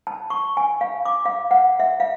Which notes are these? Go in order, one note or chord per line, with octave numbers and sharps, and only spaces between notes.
A5
C#6
G#5
F5
D6
F5
F#5
E5
F5